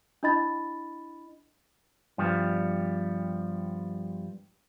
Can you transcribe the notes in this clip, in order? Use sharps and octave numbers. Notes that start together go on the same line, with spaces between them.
D4 E4 D#5 B5 A6
G2 F3 G3 B3